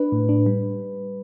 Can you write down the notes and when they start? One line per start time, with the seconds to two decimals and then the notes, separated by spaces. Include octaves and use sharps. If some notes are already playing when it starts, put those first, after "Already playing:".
Already playing: D4 B4
0.12 A2
0.29 D4
0.46 G3